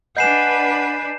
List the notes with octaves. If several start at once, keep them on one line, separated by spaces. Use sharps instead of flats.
D4 B4 D#5 F#5 G#5 G6 C7 E7